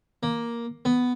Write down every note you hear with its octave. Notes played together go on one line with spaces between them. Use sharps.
A#3
B3